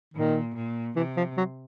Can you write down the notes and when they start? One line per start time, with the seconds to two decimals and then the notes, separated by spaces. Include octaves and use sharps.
0.13 A#2 D#3
0.54 A#2
0.96 C3 E3
1.17 F3
1.37 F#3